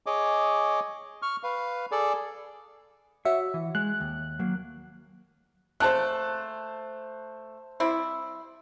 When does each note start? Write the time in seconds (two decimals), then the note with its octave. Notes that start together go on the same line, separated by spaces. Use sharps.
0.06 G#4 C#5 D#5 D6
1.22 C#6 F6
1.43 B4 F5
1.91 G#4 A4 D5
3.25 F#4 C#5 E5
3.54 E3
3.75 G#3 F#6
4.00 D#2
4.39 F#3 A#3
5.80 A3 A#3 C5 A5 F#6
7.80 G3 C4 E4